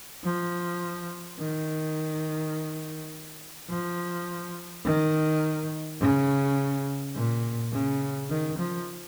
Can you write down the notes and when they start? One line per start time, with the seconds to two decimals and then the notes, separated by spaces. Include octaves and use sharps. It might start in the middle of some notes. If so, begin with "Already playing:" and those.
0.24 F3
1.39 D#3
3.69 F3
4.85 D#3
6.00 C#3
7.14 A#2
7.72 C#3
8.30 D#3
8.58 F3